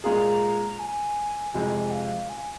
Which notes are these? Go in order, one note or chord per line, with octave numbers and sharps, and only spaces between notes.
A#2 G#3 F4 G#4 A#5
G#5
F2 C3 G#3 G#5
F5
G#5